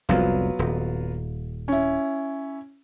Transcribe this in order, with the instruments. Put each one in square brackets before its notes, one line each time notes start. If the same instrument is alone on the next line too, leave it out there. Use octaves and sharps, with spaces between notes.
[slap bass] F1 C2 [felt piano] F#3 B3 F4
[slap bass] D#1
[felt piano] C#4 E4